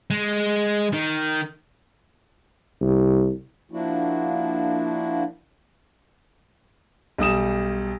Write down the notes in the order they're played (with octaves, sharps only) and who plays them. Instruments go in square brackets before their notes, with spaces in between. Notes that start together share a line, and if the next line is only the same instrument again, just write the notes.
[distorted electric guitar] G#3
D#3
[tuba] C2
[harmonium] F3 A#3 D4 E4 F#4
[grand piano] B1 G3 D#6 E7